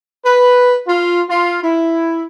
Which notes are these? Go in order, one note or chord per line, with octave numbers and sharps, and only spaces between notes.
B4
F4
F4
E4